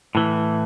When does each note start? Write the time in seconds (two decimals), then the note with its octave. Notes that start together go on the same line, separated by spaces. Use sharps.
0.15 A2 E3